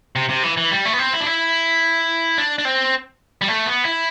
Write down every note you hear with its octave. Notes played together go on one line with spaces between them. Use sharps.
C3
C3
E3
E3
G3
A3
B3
C4
E4
D4
E4
D4
D4
C4
G3
A3
B3
E4